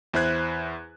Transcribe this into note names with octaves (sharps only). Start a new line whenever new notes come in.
E2 E4 C5 F#6 G#6